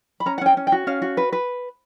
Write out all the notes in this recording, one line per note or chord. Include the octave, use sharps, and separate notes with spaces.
B5
C#4 A#5
F#5
C#4 G5
C#4
G5
F#4
C#4 F5
F#4
B4
B4